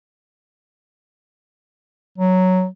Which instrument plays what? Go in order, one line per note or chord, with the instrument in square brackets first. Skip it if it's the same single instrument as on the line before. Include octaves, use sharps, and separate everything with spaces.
[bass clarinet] F#3